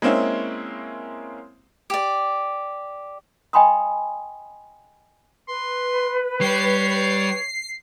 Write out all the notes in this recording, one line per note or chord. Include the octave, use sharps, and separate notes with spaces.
G#3 A#3 C4 C#4 E4
G4 D5
D#5 G5 G#5 B5 C6 D#6
B4 C6
G3 G4 C#5 C7